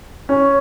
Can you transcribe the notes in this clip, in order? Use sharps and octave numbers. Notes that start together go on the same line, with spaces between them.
C#4